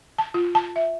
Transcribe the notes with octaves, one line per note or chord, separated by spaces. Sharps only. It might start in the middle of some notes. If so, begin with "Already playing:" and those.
A5
F4
A5
E5